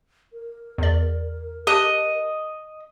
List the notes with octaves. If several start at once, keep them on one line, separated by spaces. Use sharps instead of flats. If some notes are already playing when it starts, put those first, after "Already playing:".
A#4
E2 D5
G4 D#5 A5 F#6